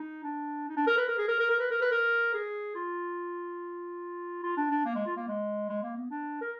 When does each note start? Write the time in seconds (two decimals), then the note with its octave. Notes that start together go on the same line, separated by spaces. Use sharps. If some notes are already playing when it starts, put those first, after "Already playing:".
Already playing: D#4
0.24 D4
0.68 D#4
0.77 D4
0.87 A#4
0.97 B4
1.08 A#4
1.18 G#4
1.29 A#4
1.39 A#4
1.50 A#4
1.60 B4
1.71 A#4
1.82 B4
1.91 A#4
2.34 G#4
2.75 F4
4.43 F4
4.57 D4
4.71 D4
4.85 A#3
4.95 G#3
5.06 F4
5.16 A#3
5.28 G#3
5.69 G#3
5.83 A#3
5.97 B3
6.11 D4
6.41 A#4